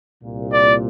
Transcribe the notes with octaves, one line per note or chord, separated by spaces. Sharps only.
C2 A#2
D5